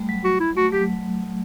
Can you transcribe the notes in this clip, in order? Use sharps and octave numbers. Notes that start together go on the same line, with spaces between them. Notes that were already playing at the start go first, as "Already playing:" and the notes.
Already playing: G3 A3
F#3
F#4
E4
A3 F#4
F#3 G4